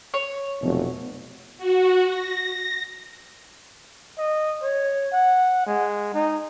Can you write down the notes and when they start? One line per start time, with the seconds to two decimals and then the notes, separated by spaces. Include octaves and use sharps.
0.14 C#5
0.62 F1 B2 F#3
1.58 F#4
2.06 A#6
4.18 D#5
4.62 C#5
5.12 F#5
5.66 G#3
6.14 D#4